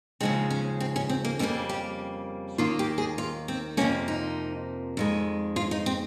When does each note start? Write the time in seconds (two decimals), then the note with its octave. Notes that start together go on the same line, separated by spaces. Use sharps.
0.20 D#2 C#3 F3 G#3 C4
0.50 C#4
0.80 C4
0.96 C#4
1.09 C4
1.25 A#3
1.39 F2 C#3 G3 A#3 C4
1.69 G4
2.58 D#2 D#3 A#3 F4
2.79 G4
2.98 G#4
3.18 F4
3.48 C4
3.77 F2 C3 F3 A#3 C#4
4.08 D#4
4.97 F2 D#3 G#3
5.56 F4
5.71 D#4
5.86 C4